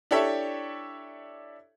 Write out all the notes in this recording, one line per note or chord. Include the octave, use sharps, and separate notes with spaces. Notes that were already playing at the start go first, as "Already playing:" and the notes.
D4 E4 G4 A4 C#5 E5